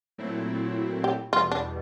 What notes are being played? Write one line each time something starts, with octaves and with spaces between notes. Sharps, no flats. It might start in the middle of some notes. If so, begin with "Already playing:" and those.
A#2 F#3 A3 C4 E4
G4
E2 B2 G3 F4
D4